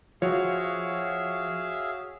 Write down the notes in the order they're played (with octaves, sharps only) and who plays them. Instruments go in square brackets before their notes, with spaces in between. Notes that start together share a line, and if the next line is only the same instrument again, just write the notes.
[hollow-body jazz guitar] F3 [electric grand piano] F#4 C#5 [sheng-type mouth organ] G#4 E5 F5